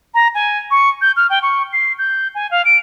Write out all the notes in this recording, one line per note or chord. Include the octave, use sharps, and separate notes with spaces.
A#5
G#5
C#6
G6
F6
G5
C#6
C7
G6
G#5
F5
D7